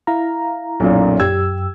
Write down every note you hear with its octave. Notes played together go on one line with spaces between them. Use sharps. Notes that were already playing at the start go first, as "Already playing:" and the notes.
E4 F5 A#5
B1 F#2 A#2
F#2 G4 E6 G#6